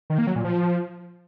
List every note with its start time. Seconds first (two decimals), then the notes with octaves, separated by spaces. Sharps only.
0.10 D#3
0.18 A#3
0.27 F#3
0.36 A#2
0.44 F3